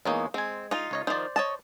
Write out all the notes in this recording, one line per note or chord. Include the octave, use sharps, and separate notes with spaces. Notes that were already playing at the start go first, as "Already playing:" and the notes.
E2 G#3 A#3 D#4 C#5 G#5
G#3 C4 G#5
D#4 F4
C#2 C#5 D#5
D#3 F3 C5 D5
C#5 D#5 A5